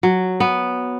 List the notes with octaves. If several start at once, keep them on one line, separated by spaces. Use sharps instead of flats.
F#3
B3